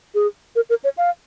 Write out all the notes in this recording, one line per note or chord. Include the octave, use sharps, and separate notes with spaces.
G#4
A#4
A#4
C#5
F5